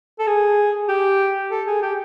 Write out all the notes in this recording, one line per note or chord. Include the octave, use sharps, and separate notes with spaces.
A4
G#4
G4
A4
G#4
G4